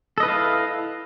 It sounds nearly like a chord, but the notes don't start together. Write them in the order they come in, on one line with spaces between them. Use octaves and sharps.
A4 D#5 B4 E4 F5